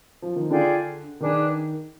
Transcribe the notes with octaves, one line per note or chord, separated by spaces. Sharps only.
F3
D#3
D3 F4 G#4 D5 G5
D#3 D4 G#4 B4